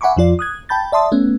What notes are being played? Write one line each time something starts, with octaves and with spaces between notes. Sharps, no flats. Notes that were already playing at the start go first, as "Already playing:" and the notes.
E5 F#5 G#5 B5 C#6 D6
F2 F3 F4 D5
D#6 F#6 G#6
G5 A5 B5 G6 A6
D5 E5 A5 C6 D#6
A3 B3 C#4